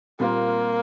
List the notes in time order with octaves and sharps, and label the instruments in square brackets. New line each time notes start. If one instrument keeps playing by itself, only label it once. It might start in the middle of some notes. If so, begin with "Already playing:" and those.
[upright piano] A#2 G3 C4 F4 A#4 [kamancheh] A#3